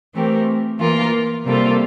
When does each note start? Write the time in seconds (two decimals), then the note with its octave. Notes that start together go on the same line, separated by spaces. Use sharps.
0.14 E3 A3 C4 G4 A#4
0.79 E3 A#3 F4 A#4
1.45 C3 G3 A#3 F4 A4